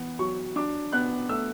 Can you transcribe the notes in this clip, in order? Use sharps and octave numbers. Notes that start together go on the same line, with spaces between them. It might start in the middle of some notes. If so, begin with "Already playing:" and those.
Already playing: E3 B3
F#3 C#6
D4 D6
B3 F#6
A3 E6